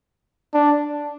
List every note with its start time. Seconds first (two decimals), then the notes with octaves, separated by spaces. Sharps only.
0.54 D4